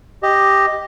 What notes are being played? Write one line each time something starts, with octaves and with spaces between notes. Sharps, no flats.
G4 D#5